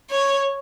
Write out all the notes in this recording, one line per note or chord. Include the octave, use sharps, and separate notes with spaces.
C#5